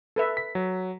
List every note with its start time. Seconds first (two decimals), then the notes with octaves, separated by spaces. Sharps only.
0.16 A4 B4 E5
0.37 B6
0.55 F#3